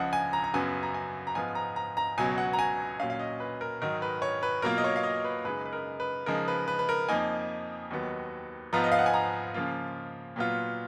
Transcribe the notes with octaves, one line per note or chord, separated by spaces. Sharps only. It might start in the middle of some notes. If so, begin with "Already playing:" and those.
Already playing: C#2 C#3 F3 D#5 F#5
G#5
A#5
A#5
F#2 C#3 F#3 B3 G#5
A#5
G#5
A#5
G#2 F3 B3 F4 G#5
A#5
A#5
A#5
C#2 B2 F#3 G#5
F#5
A#5
G#5
A#2 F#3 C#4 F5
F5
D#5
B4
A#4
G#2 D#3 F#3 A#4
B4
C#5
B4
B2 F#3 A#3 F4 A#4
D#5
C#5
F5
D#5
B4
F#2 C#3 G#3 D#4 B4
B4
A#4
B4
C#3 F3 G#3 D#4 A#4
B4
B4
B4
A#4
F2 F3 A#3 D#4 G#5
D#2 D#3 F#3 B3
G#2 F3 B3 F4 A#5
D#5
F5
F#5
G#5
A#5
C#3 F3 A#3 F4
A#2 F#3 B3 F4